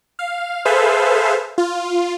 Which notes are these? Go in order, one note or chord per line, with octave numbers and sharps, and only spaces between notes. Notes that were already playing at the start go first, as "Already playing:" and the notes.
F5
G#4 A4 B4 C5 E5 F5
F4